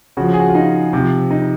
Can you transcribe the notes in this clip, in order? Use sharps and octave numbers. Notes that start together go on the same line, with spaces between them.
C#3 F3 F#4
G#4
F#4
F4
D#4
C3 F3
D#4